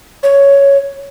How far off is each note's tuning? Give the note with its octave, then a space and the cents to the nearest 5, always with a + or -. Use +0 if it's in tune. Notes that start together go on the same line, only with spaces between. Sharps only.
C#5 +5